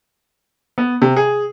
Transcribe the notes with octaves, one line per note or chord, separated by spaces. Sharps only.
B3
C3
G#4